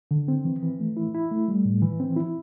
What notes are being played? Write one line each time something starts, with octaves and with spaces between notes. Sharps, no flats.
D3
C4
E3
E3
A3
E4
E4
A3
G3
A2
E3
C4
E4